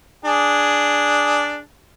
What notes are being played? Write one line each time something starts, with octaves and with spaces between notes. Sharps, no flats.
D4 G#4